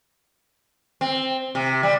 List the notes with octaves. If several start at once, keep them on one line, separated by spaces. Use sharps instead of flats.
C4
C3
G3